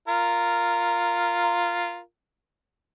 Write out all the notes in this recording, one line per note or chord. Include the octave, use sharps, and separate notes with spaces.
F4 A#4